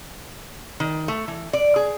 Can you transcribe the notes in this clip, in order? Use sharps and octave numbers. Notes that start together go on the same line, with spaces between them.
D#3
A3
E3
D5
G#4